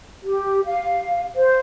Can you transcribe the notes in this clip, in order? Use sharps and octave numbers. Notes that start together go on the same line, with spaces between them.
G4
F5
C5